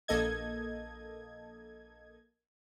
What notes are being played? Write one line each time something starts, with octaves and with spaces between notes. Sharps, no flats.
A#1 A#3 A4 D#5 G#6